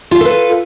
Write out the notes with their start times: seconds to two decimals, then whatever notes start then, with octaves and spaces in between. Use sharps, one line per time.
0.11 F4
0.16 F5
0.21 A4
0.25 B4